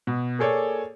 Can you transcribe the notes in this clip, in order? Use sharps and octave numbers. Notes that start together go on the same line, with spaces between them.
B2
A#3 G#4 A4 C#5 D5